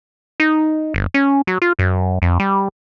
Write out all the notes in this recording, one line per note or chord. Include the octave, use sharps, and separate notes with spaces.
D#4
G1
C#4
F#3
F4
F#2
F2
G3